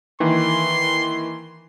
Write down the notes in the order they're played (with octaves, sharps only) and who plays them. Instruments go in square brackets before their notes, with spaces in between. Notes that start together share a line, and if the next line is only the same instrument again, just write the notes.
[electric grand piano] D#3 E3 A#3 [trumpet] C6